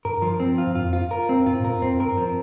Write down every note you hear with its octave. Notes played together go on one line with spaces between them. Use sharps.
G2 A#4
F3
C4
F4
G2
F2 F4
F4
A#4
C4
G2 F4
A2
G2 A#4
F2 C4
G2 A#4
F3